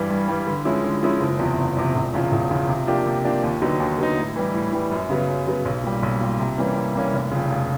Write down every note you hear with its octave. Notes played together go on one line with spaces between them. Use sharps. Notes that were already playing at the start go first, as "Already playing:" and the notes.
Already playing: G2 E3 G3
G2
E3 G3
D3
F3 G#3 C#4 E4
D3
F3 G#3 C#4 E4
F#1
E2 C3 F3
F#1
E2 C3 F3
E1
E2 C#3 F3
E1
E2 C#3 F3
C3
F3 A#3 D4 G4
C3
F3 A#3 D4 G4
D#2
D3 F#3 B3 D#4
D#2
D3 F#3 B3 D#4
A2
E3 G3
A2
E3 G3
F#2
C#3 F#3 B3
F#2
C#3 F#3 B3
B1
A#2 G3
B1
A#2 G3
C3
E3 G3 A#3 C#4
C3
E3 G3 A#3 C#4
F1
F2 C#3
F1